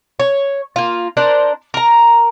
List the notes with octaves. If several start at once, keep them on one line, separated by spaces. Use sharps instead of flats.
C#5
A#3 F4
D4 A#4 C5
A#4 A#5